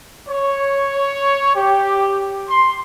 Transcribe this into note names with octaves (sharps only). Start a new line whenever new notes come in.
C#5
G4
C6